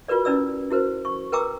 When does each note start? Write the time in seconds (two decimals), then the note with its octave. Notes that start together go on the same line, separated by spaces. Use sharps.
0.08 F4 F#4 A#4 B4 D5
0.25 C#4 E4 B4 D5 E6
0.71 E4 F#4 A#4 C5
1.05 C#6
1.32 A#4 B4 G5 A#5 D6 E6